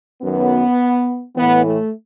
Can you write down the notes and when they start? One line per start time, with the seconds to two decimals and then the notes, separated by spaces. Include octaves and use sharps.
0.21 F#2 D#3 F#3 B3
1.36 A2 E3 B3
1.65 A3